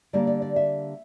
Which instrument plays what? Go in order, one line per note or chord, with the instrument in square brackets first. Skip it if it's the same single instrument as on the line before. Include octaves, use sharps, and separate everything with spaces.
[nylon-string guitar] D3 G3 A#3 D5
D5
D5
E5